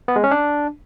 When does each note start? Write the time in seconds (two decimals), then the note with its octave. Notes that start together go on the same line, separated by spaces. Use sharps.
0.08 B3
0.16 G#3
0.24 C#4
0.31 D4